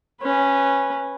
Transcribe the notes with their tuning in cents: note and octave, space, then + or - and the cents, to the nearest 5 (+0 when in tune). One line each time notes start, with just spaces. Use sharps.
C#4 -10 B4 +0